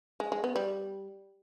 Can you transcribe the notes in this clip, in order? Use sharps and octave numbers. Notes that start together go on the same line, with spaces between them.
G#3
G#3
B3
G3